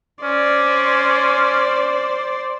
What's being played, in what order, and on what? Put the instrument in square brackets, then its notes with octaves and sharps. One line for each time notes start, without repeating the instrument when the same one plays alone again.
[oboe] C#4 [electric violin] C5 D5